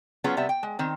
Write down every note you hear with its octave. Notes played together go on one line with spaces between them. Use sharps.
F#3 B3 C#4 F4 G#4 C#5
C3 G3 B3 E5
G5
G#3
D#3 C4